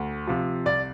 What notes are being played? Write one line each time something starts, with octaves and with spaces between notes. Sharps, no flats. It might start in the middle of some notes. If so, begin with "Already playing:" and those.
Already playing: D2
C3 F3
C2 D5